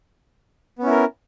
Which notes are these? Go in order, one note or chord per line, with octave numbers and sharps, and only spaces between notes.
B3 C#4 E4 A#4